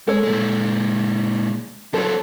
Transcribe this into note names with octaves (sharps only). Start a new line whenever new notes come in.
G#3 A4 C#5
A#2 G#3
F#3 C4 A4 C#5